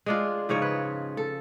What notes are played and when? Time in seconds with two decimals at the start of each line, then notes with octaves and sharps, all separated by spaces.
0.06 G#3 D4 F4
0.49 G#2 C#3 F3 C#5
0.62 B4
1.17 A4